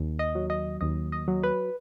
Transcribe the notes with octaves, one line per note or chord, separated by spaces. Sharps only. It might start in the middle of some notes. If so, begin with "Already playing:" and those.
Already playing: D#2
D#5
F#3
D#5
D#2 D#5
D#5
F#3
B4